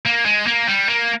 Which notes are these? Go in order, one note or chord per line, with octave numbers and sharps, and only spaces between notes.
A#3
G#3
A#3
G3
A#3